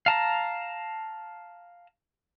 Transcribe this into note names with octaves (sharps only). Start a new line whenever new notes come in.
F5 A5 A#5